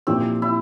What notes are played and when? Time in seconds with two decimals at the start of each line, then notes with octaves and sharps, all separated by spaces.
0.07 A#2 F3 A#3 C4 E4 G4
0.42 E4